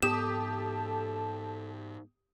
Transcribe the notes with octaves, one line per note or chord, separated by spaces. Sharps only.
G#2 B3 G4 A4 A5 D#6 E7